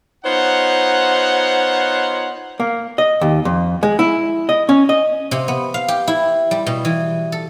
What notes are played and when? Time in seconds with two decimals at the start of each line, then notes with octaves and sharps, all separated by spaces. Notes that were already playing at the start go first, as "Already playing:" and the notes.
0.25 B3 D#4 F4 C5 C#5 F#5
2.60 A#3
2.98 D#5
3.21 D#2
3.45 F2
3.83 G#3
3.99 E4
4.49 D#5
4.69 C#4
4.89 D#5
5.31 C3
5.48 B3
5.74 F5
5.88 G4
6.08 E4
6.51 G3
6.66 B2
6.85 E3
7.32 A4